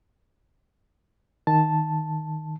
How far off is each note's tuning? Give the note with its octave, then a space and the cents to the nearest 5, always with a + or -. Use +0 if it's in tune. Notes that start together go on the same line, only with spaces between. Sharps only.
D#3 +0 A5 +0